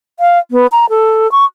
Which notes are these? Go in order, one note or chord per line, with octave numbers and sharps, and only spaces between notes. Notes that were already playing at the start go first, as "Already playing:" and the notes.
F5
B3
A#5
A4
C#6